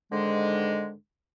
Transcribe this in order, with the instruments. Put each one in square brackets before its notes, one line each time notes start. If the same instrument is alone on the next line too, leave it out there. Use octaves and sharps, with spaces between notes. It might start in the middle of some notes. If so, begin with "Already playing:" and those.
[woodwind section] G#2 D3 D#3 G#3